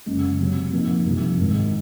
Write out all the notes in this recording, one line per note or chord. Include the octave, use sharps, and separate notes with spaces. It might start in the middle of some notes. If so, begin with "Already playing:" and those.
F#1 F#2 C#3 G#3
C3 F#3 C4
A#2 F3 C4 D#4
C2 C3 F3
G#1 G#2 D#3 G#3 D#4